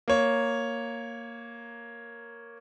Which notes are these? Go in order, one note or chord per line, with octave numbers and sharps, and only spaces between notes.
A#3 C#5